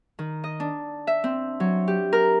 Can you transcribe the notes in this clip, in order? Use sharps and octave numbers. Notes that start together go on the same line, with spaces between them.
D#3
D#5
D4
E5
C4
F#3
G4
A#4